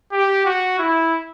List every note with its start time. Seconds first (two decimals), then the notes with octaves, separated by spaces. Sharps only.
0.12 G4
0.45 F#4
0.79 E4